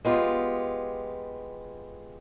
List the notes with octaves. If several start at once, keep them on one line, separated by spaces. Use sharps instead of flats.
G#3 B3 F4 G4